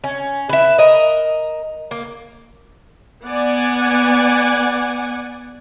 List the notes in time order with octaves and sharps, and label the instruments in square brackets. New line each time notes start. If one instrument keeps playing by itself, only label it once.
[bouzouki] C#4
B4 E5
A#4 D#5
A#3
[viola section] B3 D5 F#5 G#5